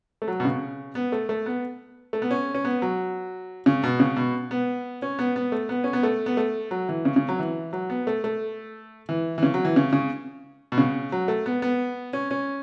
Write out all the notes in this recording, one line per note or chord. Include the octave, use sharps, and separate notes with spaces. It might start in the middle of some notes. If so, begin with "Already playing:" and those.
A3
F#3
B2
C#3
B3
A3
A3
B3
A3
B3
C#4
C#4
B3
F#3
C#3
B2
C#3
B2
B3
C#4
B3
B3
A3
B3
C#4
B3
A3
B3
A3
F#3
E3
C#3
C#3
F#3
E3
F#3
B3
A3
A3
E3
E3
C#3
F#3
E3
C#3
C#3
B2
C#3
F#3
A3
B3
B3
C#4
C#4